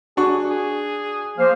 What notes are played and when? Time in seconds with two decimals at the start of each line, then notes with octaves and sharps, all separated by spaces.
0.17 D4 F#4 G#4 C#6
0.50 G#4
1.38 F3 A#3 C5 F5